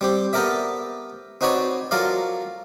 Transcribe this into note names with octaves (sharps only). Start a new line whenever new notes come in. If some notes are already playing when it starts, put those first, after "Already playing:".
G3 C4 G4
B3 G4 A4 A#4 D5 E5
C4 D#4 F#4 B4 C#5 D5
F#3 F4 A4 A#4 D5 F5